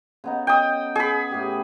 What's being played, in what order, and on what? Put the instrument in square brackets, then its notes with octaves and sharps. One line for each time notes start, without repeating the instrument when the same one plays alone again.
[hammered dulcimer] C#3 B3 D#4
[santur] G5 D#6
G#4 B5
[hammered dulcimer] A2 G4